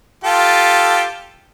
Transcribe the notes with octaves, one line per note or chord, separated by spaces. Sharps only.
F4 G4 A4